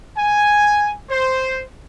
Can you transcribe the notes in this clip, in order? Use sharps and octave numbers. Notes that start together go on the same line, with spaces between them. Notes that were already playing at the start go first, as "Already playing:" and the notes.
G#5
C5